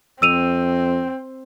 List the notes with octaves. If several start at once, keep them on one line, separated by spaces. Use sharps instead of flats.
F2 C4 E6 D#7 F7